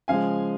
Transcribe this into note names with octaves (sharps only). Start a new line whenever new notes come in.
C#3 F3 G#3 F5 G#5